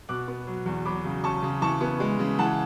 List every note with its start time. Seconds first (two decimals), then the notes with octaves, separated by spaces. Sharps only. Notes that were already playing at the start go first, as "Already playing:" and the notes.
0.09 B2 D6 F#6
0.28 B3
0.47 F#3
0.66 E2
0.86 F#3 B5 D6
1.05 C#3
1.24 C#4 A5 C#6
1.43 C#3
1.62 E3 A5 C#6
1.81 B3
2.00 G#3
2.19 C#3
2.39 E3 F#5 A5